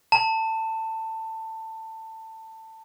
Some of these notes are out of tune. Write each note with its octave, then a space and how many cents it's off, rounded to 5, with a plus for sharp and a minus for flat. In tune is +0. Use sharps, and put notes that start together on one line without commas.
A5 +20